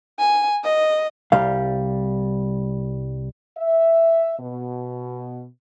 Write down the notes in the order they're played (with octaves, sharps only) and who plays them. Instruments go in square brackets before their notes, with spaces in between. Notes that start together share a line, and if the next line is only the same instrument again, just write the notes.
[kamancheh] G#5
D#5
[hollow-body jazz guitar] C2 G3 F5
[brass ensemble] E5
B2